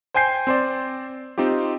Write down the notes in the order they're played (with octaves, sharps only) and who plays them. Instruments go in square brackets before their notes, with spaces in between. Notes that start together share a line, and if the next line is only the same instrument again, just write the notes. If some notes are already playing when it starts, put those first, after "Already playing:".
[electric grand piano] C5 G5 G#5 G6 C7
C4 C5 D5
C4 D#4 F4 G4